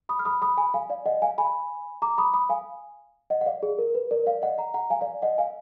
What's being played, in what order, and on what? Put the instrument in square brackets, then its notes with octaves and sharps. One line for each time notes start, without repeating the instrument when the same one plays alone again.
[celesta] B5 D#6
F6
B5 D#6
B5 D#6
G#5 B5
F5 G#5
D5 F5
D#5 F#5
F5 G#5
G#5 B5
A#5 D6
B5 D#6
B5 D#6
F5 G#5
D#5 F#5
F#5
D5 F5
G#4
A#4
B4
A#4 D5
D5 F5
D#5 F#5
F#5 A#5
F#5 A#5
F5 G#5
D5 F5
D#5 F#5
F5 G#5